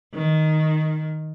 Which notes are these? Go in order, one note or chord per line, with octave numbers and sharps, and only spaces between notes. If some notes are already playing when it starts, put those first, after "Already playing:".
D#3